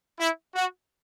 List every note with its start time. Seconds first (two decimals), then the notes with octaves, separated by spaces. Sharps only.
0.18 E4
0.54 F#4